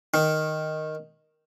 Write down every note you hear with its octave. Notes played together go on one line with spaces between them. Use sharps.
D#3